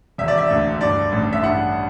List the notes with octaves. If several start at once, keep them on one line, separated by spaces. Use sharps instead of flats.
E1 E5
D5
E5
D2
G2 D5
A1
E5
G2 F#5